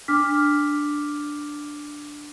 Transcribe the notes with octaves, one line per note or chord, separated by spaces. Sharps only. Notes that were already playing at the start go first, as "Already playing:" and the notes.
D4 D6 F6 B6